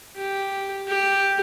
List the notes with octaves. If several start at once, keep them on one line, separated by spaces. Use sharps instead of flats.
G4
G4